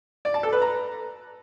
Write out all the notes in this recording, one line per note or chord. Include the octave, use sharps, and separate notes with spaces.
D5
A5
A4
B4
A#5